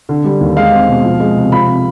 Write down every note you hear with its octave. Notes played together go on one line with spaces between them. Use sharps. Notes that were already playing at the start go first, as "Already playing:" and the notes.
D3
G3
D#2
G#3 F5
C4
B2
F3
G#3
C3
F3 B5
C4